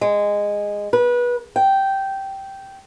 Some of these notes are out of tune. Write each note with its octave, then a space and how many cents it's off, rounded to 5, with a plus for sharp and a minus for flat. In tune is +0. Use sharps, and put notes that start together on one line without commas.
G#3 -15
B4 -25
G5 -10